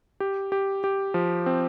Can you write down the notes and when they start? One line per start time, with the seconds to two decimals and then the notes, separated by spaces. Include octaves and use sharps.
0.20 G4
0.52 G4
0.84 G4
1.14 F3
1.46 C4